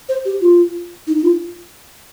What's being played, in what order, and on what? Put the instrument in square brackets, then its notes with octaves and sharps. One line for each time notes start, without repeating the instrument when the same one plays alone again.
[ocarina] C5
G4
F4
D#4
D#4
F4